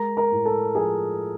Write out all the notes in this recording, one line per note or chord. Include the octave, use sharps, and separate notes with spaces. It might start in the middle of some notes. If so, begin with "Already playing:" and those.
Already playing: G#3 A#4 A#5
A#4 A#5
A2
A4 A5
F3 G#4 G#5